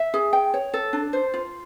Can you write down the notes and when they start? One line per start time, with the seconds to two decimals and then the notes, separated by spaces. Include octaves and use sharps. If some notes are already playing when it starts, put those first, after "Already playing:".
Already playing: E5
0.14 G#4
0.33 G5
0.54 C#5
0.74 A4
0.93 D4
1.13 C5
1.34 F4